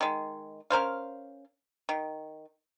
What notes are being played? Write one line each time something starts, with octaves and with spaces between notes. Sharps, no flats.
D#3 G#3
C#4 A#4 C5 F5
D#3